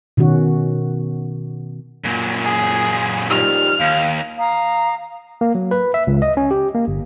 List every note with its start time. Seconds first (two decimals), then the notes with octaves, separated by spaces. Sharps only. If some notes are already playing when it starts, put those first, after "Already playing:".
0.17 B2 D#3 C#4 F#4
2.04 F#2 A#2
2.44 G#4
3.30 D#3 F3 G3 F6
3.80 D#2 F5
4.38 F5 A#5 D#6
5.41 A#3
5.55 F#3
5.71 B4
5.94 E5
6.07 C#2
6.22 D#5
6.37 C#4
6.51 G4
6.75 A#3
6.88 G1